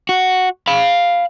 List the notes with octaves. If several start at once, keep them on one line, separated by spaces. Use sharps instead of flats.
F#4
F5 B5